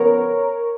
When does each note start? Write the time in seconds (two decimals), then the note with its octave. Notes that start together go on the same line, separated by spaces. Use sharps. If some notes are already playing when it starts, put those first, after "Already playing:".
Already playing: F2 C#3 F3 B3 A#4 C#5